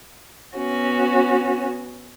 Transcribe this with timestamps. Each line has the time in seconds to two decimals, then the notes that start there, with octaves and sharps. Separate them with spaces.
0.56 B3 C#4 F#4